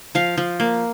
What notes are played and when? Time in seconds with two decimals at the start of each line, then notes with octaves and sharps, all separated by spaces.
0.15 F3 F5
0.38 F3
0.60 A#3